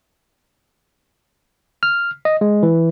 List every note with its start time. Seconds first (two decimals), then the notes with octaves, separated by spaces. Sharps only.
1.83 F6
2.25 D#5
2.41 G#3
2.63 E3